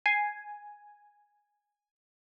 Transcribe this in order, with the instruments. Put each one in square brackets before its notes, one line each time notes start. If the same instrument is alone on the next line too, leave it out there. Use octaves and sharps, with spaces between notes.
[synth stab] G#5 [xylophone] C7